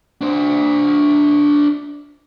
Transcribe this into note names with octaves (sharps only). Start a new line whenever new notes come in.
D4 C5